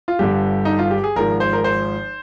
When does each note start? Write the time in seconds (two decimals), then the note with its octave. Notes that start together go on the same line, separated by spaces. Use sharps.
0.08 F4
0.19 G1 G2 D3 G4
0.65 D#4
0.79 F4
0.91 G4
1.04 G#4
1.16 G#1 G#2 F3 A#4
1.40 C5
1.53 A#4
1.64 C5